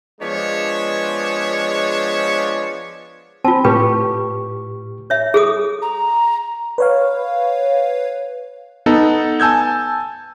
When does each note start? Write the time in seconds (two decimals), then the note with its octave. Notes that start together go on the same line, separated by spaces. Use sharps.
0.21 F3 G#3 B3 D4 C#5
3.44 C4 F4 A5
3.65 A2 G4 B4 C#6
5.10 C#5 E5
5.34 G#4 A4 D#6
5.82 A#5
6.78 B4 C#5 F5
8.86 B3 D#4 A4
9.40 G#5 A5 E6 G6 G#6